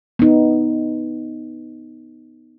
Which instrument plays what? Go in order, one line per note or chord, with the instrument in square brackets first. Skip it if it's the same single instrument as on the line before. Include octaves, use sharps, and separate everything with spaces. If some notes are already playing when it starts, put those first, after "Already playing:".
[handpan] B3 D#4